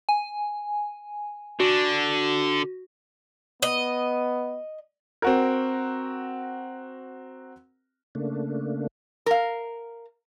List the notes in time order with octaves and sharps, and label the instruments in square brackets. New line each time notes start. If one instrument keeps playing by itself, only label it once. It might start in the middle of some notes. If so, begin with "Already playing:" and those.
[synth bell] G#5
[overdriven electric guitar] D3 [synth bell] F#4
[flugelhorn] B3 [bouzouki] D#5
[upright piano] C4 F#4 A#4
[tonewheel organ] C#3 A3 A#3 D4
[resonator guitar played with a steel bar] A#4 F5